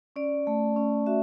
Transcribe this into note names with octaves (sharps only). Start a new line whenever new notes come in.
C#4 D5
A3
C#4
F#4 E5